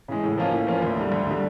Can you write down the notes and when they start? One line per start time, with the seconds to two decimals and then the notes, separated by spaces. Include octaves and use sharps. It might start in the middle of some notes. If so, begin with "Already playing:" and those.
0.08 C#3 E3 G#3
0.23 A2
0.38 F3 A#3 C#4 F4
0.52 A2
0.67 F3 A#3 C#4 F4
0.82 D2
0.97 D3 G3
1.12 D2
1.27 D3 G3